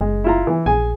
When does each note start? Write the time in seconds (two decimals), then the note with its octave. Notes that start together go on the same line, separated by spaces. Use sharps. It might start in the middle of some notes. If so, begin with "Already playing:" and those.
0.01 F#1 G#3
0.24 E4 F4 A#5
0.47 E3
0.66 A#1 G#4 G#5